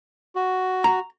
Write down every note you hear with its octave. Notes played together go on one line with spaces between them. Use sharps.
F#4
A#5